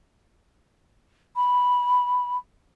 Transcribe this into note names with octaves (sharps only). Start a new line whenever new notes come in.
B5